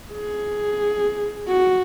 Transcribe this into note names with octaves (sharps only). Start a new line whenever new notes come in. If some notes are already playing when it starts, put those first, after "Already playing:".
G#4
F#4